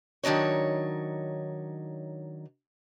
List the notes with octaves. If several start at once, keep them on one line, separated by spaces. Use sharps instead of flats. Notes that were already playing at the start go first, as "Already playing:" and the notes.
D#3 F#3 D4 D#4 C#5